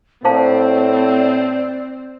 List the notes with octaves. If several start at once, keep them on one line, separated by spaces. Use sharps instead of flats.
A2 C4 C5 D5 F5 A5